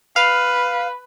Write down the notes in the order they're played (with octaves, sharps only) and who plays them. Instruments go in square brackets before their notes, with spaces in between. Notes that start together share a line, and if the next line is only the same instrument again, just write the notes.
[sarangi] B4 [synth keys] F5